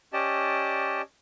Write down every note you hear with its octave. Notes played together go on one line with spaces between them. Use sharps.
C#4 G4 D5 D#5 A5